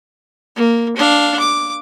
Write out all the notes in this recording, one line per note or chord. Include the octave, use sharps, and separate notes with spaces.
A#3
D4 F5
D6